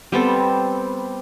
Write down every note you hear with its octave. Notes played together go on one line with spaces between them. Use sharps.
G3 B3 C4 A4